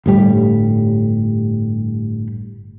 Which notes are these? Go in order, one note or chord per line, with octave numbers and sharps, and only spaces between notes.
G1 A2 G3